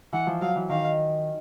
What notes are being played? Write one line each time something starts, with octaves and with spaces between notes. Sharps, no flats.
E3 F#5
F3
F#3 F5
E3
D#3 F5